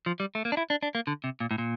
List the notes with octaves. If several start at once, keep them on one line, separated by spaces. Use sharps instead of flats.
F3
G3
A3
A#3
D4
E4
D4
D4
A#3
D3
C3
A#2
A2
A#2